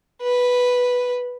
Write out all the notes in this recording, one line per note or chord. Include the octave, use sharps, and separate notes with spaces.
B4